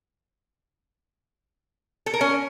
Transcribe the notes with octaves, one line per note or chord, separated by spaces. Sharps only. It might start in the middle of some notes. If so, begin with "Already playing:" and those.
A4
A#4
C#4